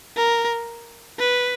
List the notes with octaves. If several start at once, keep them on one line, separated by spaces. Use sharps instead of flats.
A#4
B4